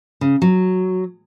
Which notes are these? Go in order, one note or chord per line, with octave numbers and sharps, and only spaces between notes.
C#3
F#3